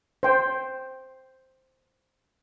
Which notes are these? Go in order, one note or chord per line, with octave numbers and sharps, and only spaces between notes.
C5 G5